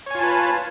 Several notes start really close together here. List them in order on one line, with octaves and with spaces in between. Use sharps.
C#5 G#5 F4 A5 B4